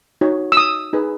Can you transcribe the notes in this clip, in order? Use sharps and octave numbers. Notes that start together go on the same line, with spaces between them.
D#4 F#4 C#5
E6
D#6
D#4 G#4 B4